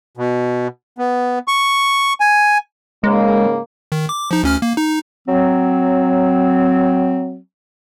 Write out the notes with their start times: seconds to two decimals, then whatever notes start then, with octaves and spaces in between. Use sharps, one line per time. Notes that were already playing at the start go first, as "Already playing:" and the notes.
0.17 B2
0.98 B3
1.48 C#6
2.20 G#5
3.04 G#2 C#3 G#3 A#3
3.92 D#3
4.09 D6
4.31 F3 D#4
4.43 D2 C#4 F6
4.62 A#3
4.77 D#4
5.28 F#3 C4